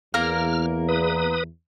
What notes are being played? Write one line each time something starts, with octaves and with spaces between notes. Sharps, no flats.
E2 A#3 A#4 A#5 F6
B4 D#6